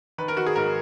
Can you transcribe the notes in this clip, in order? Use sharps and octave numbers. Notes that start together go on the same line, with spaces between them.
D#3 B4
A#4
D#3 F#4
G#4
G#2 A#4